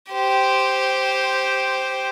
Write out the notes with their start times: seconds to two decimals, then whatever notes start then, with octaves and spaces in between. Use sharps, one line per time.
0.12 G4 C5